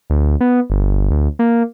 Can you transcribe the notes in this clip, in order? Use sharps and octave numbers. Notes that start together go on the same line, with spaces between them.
D2
B3
G1
D2
A#3